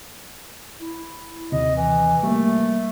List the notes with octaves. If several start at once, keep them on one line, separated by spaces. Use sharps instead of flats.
E4
D#2 C3 D#5
E3
G3 A3 A#3